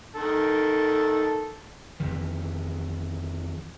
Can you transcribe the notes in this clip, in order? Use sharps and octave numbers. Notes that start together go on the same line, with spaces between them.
D#3 A4
F2 D#3 E3